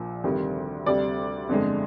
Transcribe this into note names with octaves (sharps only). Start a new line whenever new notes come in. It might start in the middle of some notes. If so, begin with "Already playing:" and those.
Already playing: A#1 A#2 F3
D2 C3 D#3 G3
D2 C3 G3 D5
G1 F2 D3 G#3